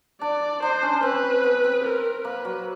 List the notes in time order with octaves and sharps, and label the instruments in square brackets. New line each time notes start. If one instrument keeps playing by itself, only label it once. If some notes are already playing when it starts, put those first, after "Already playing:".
[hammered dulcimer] D4 [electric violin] D5
[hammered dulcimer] D4 [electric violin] C5
[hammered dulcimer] C#4
[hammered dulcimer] C4 [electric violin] B4
[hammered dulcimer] B3
C4
[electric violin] A#4
[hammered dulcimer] A#3 [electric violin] B4
[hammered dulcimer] F#3